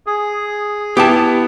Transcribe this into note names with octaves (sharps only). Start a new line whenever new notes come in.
G#4
B3 E4 G4 G5 A5